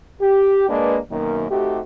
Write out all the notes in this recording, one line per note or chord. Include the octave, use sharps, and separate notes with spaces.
G4
G#3 A#3 D4 B4
F#2 B2 D#3 A#3
A3 C4 D#4 F#4 G4